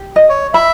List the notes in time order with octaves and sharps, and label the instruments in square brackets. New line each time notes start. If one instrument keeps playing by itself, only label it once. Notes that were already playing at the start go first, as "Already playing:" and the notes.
Already playing: [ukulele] G4
D#5
[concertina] C#5
[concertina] E5 [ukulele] B5